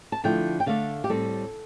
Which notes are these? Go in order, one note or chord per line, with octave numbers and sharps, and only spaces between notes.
A5
D3 F3 A3 E4 G5
G5
D3 A3 D4 F5
G4
A2 G3 C4 A4